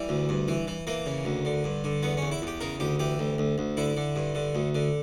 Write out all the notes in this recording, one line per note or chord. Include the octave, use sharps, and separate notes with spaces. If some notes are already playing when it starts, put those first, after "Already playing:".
Already playing: E3 G3
D2
G2
E3
E3
E3 A#3
C#3
D2
D3
G2
D3
E2 B3
E2 C#4
E4
E2 G4
C#3 A#4
D2 G4
E3 G4
D2
D2
D2
D3 E4
D3
G2
D3
D2
D3